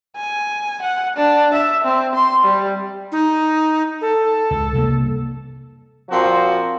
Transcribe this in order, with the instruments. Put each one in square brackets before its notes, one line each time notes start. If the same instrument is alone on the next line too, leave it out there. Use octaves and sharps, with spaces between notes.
[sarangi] G#5
F#5
D4
E5
C4
C6
G3
[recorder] D#4
A4
[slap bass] C#2
C2 F3 A#3
[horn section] A#2 F3 C4 F#4